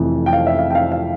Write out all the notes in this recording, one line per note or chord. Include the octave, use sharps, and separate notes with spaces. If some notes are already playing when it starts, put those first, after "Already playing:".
Already playing: F1 F2 E3
G5
F5
E5
F5
G5
F5
F5